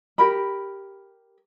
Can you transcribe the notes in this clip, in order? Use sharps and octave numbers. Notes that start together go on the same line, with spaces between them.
G4 A#4 B5